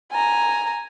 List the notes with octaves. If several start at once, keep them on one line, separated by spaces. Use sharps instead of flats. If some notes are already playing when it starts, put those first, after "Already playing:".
G#5 A#5